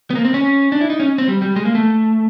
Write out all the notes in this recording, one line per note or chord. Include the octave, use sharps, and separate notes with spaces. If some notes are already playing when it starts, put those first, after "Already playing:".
B3
A#3
C4
C#4
D4
E4
D#4
C#4
C4
G3
G3
G#3
A#3
A3